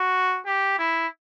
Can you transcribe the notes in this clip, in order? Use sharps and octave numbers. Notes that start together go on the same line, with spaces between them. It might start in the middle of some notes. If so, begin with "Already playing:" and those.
Already playing: F#4
G4
E4